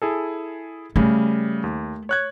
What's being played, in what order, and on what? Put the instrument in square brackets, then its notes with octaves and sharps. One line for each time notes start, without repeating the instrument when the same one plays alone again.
[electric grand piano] E4 G#4 A4
[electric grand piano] C#3 G3 [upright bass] A3
[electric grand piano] D#2
C#5 F#6 G#6